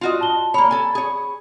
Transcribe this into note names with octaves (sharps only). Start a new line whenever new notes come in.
F4 F#4 D#5
A5 G7
A#3 C#5 B5
A4 G#5
G#4 C#5